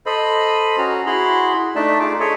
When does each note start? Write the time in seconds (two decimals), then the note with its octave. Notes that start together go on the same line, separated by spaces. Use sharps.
0.06 A4 C5 D#5 B5
0.78 C#4 F#4 A#5
1.06 E4 F#4 G#4 B5 C6
1.76 A3 D4 D#4 D5 E5 A5
2.00 D#4 F4 G#4 D6
2.20 G#4 A4 C#5 D#5 E5